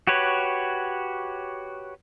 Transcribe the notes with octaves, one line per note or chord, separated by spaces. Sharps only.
F#4 G4 B4 C#5